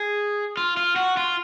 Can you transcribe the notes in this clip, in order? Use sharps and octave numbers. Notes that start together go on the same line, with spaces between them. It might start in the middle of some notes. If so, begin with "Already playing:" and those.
Already playing: G#4
F4
F4
F#4
F4